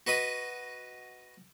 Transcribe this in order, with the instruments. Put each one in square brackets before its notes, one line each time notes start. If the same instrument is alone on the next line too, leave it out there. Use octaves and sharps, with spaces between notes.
[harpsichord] F#4 B4 D#5 B5